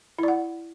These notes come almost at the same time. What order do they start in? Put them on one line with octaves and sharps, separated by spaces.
E4 D5 F#5